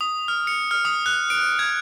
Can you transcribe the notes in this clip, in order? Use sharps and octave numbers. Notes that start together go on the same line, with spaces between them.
D#6
F6
C#7
F6
D#6
F#6
D7
G#6